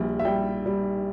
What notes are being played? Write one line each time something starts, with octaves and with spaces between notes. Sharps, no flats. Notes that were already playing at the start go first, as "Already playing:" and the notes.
Already playing: A#1 G3
E5
G3 G5
G3